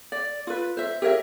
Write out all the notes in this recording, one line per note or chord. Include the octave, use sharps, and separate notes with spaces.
D5
F4 B4
C5 E5
G4 A#4 C#5 E5